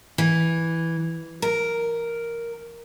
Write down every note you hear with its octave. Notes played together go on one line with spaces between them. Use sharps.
E3
A#4